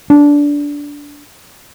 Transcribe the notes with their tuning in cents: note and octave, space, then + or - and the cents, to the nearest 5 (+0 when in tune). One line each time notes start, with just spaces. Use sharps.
D4 -15